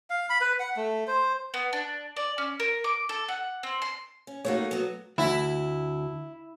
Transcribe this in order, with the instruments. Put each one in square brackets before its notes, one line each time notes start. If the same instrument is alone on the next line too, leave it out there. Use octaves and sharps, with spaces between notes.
[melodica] F5
B5
B4
F#5
A3
C5
[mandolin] B3
D4
D5
C#4
A#4
D6
A4
F#5
C4
C6
[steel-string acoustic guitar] C#4
[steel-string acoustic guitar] A3 A#3 D#4 [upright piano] F#4 A4 C#5
[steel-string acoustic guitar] F#3 B3
[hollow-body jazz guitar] D2 [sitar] E4